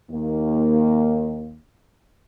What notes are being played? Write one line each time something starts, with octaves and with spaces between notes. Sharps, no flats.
D#2 A#3